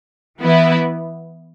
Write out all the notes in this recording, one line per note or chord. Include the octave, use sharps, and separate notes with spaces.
E3 B3 E4 B4